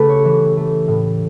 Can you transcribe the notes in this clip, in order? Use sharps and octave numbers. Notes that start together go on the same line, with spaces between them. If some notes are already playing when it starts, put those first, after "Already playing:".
Already playing: C#3 A3 G4 A4 B4
C#5
E3
A3
A2